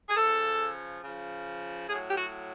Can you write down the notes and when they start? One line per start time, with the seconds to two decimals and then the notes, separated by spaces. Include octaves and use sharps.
0.09 G#4
0.16 C#3 F3 A4
1.03 C#3 F3
1.89 A2 F#3 G#4
2.09 G4
2.17 F#4